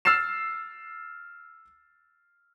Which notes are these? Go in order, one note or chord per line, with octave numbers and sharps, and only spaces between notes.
E6 F6 A6 C7 E7